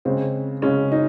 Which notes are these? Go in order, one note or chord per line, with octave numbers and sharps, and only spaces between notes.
C#3 G#3 C4
C#3 G#3 C#4
D#4